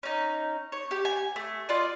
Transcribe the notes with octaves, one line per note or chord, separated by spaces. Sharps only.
C#4 D#4
C#5
G4
G#5
A3
F4 D5 D#5